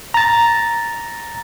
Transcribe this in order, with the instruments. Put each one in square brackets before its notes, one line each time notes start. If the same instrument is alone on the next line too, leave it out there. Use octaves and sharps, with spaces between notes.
[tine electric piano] A#5 A6